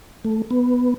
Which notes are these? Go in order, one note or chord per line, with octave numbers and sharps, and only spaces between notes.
A3
B3